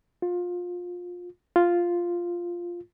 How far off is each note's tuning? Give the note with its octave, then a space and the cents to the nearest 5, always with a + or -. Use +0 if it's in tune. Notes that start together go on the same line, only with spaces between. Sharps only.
F4 +25
F4 +0